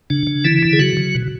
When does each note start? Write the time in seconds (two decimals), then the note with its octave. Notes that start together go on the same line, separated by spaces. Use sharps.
0.10 C#3 D4
0.27 C#3
0.45 D3 E3 E4
0.63 D3
0.73 G#4
0.79 C#3 F#3 F#4
0.97 C#3
1.15 B2